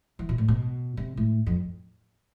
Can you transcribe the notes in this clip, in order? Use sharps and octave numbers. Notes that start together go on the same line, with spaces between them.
E3
B2
A2
B2
C3
A2
F2